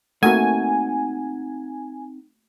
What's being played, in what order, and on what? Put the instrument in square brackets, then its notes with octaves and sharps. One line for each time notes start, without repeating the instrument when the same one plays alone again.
[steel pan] A3 A#3 F#4 [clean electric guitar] C4 D#4 F#5 [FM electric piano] G#5